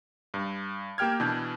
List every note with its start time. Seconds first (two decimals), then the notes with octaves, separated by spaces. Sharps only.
0.34 G2
0.98 A#3 G4 G5 F6 G#6
1.20 B2 E3 D4 G6